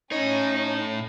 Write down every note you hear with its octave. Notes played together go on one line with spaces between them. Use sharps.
A2 C#4 D#4 C#5